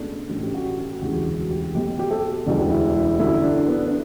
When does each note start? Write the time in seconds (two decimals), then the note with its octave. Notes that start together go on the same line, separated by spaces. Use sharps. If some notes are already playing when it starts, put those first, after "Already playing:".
Already playing: C#2 B2 A3 D4
0.29 A1 A2 G3 D4
0.43 G4
0.54 F#4
0.78 G4
1.02 E1 D2 C#3 E3 F#4
1.50 G4
1.74 B1 B2 F#3 A3 G4
1.99 G4
2.11 A4
2.46 E1 D2 C#3 E3 G3
2.71 E4
2.95 E4
3.19 F#2 D3 G3 E4
3.44 D4
3.67 B3
3.86 D4